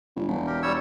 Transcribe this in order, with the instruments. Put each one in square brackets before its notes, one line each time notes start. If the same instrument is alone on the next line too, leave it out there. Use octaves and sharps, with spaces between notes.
[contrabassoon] G1
E1
[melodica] G4 A#4
G3 C#5 E6